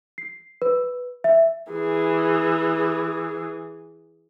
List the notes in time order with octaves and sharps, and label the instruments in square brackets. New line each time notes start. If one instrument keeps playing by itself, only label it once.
[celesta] C7
B4
E5
[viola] E3 G#4